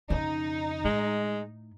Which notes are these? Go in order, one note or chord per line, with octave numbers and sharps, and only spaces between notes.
F2 C#3 D#4
A2 G#3